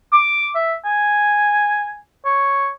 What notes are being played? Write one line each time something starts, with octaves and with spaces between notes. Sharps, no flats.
D6
E5
G#5
C#5